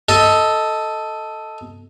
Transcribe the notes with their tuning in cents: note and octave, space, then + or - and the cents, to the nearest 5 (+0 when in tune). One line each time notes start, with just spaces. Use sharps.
A4 +0 D#5 +15